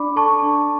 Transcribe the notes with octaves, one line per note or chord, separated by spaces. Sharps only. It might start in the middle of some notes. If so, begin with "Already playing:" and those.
Already playing: D4 D5 B5 D6
A4 A5 C#6
D4